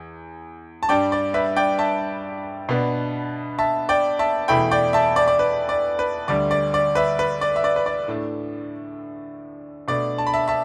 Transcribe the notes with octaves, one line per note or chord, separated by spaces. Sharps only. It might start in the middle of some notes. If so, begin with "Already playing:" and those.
Already playing: E2
A5
G2 G3 D4 D5 G5
D5
B4 E5
D5 G5
E5 A5
B2 B3 D4
E5 A5
D5 G5
E5 A5
E2 B2 A3 E4 G5 B5
D5 G5
E5 A5
D5
D5
B4
D5
B4
D2 D3 G3 D5
D5
D5
B4 E5
B4
D5
E5
D5
B4
D5
A2 A3 D4
B2 A3 D4 D5
A5
B5
E5 A5
E5 A5